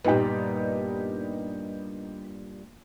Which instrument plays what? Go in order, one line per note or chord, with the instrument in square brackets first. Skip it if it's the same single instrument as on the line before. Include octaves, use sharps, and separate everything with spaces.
[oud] G2 A#2 [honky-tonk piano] B3 D#4 G4